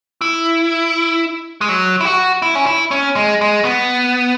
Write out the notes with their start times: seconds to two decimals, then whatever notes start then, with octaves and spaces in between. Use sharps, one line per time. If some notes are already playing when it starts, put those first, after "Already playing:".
0.21 E4
1.61 G#3
1.69 F#3
2.01 E4
2.05 F#4
2.42 E4
2.55 C#4
2.66 E4
2.91 C#4
3.16 G#3
3.41 G#3
3.65 B3